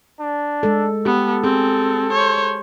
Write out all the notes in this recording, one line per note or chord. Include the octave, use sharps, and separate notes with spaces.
D4
G#3 A4
B3 G4 A4
C4 G#4
C5 C#5